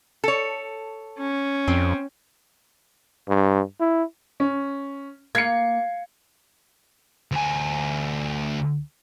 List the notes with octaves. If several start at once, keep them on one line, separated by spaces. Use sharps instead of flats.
A4 C#5
C#4
F2 C4
G2
E4
C#4
A#3 G#6 C7 C#7
D2 G#5